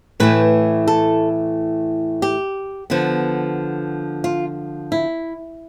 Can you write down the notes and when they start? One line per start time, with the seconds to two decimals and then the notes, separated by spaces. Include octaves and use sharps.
0.20 A2 E3 A3 B4
0.88 A4
2.22 G4
2.90 D3 F3 B3
4.24 F4
4.92 E4